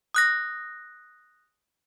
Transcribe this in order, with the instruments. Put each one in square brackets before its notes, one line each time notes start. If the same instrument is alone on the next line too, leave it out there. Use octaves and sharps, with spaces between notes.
[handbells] D#6 F#6 A#6